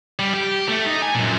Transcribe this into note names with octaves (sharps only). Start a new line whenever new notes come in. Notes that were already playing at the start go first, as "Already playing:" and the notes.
G3
G4
A3
D#4
G#5
F#2 A#2